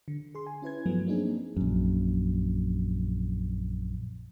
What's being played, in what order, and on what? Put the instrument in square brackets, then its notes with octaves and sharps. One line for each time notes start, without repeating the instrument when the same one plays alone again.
[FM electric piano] D3
G#4 C6
G#5
C#4 E4 B4 G#6
G2 F3 F#3 A3 B3
A#3 C4 D4 D#4 G#4
[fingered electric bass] A#1 F#2